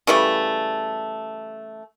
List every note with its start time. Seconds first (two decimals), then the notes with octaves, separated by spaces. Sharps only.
0.07 C#3 E3 G3 A3